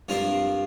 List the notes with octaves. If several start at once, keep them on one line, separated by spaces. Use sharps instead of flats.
G2 F3 C4 F4 A#4